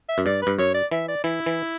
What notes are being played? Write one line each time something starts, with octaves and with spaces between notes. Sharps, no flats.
E5
F#2
G2 D5
G2 B4
F#2 C#5
D5
E3 E5
D5
E3 E4
E3